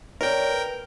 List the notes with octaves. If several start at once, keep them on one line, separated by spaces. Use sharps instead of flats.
A#4 C#5 D5 G5
B4